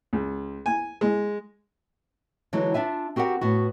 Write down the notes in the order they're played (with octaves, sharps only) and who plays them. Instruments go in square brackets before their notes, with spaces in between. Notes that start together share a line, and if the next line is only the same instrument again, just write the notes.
[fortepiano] C#2
G#5
G#3
[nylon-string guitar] D3 E3 F#3 G#3 E4
D4 F4 E5 G#5
C4 F#4 G4 A#4 F#5
A2 B3 F#4